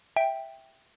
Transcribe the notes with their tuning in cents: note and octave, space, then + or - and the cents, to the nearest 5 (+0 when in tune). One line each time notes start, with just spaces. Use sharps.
E5 -5 G5 +5